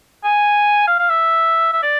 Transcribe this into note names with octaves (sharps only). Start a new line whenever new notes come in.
G#5
F5
F5
E5
E5
D5